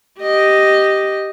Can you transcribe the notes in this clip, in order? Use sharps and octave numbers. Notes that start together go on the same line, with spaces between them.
G4 D#5